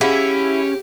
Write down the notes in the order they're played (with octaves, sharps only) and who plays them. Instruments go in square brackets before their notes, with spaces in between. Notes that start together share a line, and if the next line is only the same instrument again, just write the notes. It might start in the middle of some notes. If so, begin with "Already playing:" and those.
[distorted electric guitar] C#4 [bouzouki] E4 [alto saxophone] G4 [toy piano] G#4 F5 F#5